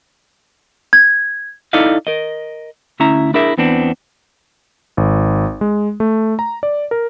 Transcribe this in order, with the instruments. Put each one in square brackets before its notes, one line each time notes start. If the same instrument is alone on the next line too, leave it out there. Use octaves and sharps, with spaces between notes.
[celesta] G#6
[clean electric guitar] D#4 E4 A4 D5 D#5 F5
A#4 D#5
D2 C#4 E4 E5 A#5
D4 E4 G#4 A#4 E5
E2 E3 B3 C4 D4
[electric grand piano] G#1
G#3
A3
A#5
D5
A#4